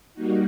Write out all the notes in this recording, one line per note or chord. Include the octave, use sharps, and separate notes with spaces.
G3 A#3 D#4 F#4